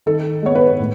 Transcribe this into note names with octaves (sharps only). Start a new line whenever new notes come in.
D#3 A4
G#3 B3 C#5
B4
A2